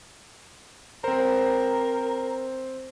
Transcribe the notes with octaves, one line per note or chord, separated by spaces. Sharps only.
C4 A#4 C5